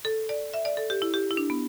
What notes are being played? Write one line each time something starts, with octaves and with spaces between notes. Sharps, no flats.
A4
D5
E5
D5
A4
G4
E4
G4
E4
D4
B3